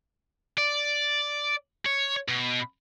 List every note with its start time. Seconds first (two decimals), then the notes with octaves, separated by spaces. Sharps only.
0.58 D5
1.85 C#5
2.28 B2